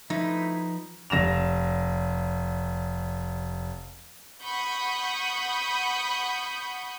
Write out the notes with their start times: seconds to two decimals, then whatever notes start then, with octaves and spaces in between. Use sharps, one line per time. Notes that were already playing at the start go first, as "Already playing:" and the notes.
0.10 F3 A3 D#4 E4 B4 B5
1.10 F1 A#6 E7 F7
4.42 F#5 B5 C#6 D#6 G6